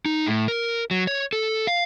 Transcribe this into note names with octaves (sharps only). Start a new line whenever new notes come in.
D#4
A2
A#4
F#3
C#5
A4
F5